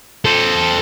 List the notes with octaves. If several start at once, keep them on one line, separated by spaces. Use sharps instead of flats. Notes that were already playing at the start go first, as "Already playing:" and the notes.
A4 C5